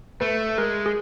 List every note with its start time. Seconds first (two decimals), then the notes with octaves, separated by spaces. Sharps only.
0.21 A3 B4
0.58 G#3 A#4
0.86 G#4